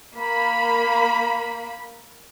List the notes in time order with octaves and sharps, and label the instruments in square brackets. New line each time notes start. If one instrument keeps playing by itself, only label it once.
[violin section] A#3 B5